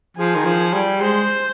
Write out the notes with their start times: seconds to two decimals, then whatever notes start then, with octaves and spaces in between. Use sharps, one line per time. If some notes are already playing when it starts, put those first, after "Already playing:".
0.17 F3 G#4
0.35 D#3
0.45 F3
0.73 G3
1.01 G#3 C5